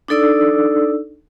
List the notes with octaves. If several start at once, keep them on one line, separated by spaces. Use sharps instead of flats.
D4 D#4 A4 D5 E6